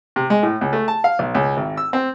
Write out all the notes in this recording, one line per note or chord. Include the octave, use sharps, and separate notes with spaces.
C3
G#3
A2
C#2
A3
A5
F5
B1
C#2
G#1
E6
C4